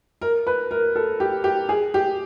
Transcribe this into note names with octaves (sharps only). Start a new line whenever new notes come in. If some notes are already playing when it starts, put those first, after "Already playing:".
A#4
B4
A#4
A4
G4
G4
G#4
G4